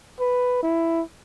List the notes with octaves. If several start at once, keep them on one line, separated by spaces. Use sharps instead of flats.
B4
E4